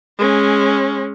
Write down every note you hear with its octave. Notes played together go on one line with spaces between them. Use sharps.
G#3 C#4